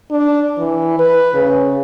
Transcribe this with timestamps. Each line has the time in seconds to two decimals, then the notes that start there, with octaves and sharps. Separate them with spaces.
0.11 D4
0.59 E3
0.99 B4
1.35 C#3